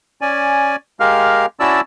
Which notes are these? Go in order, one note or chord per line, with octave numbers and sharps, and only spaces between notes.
C#4 D5 G#5
G#3 G4 A#4 F5 F6
C#4 E4 F#4 D5 A5 E6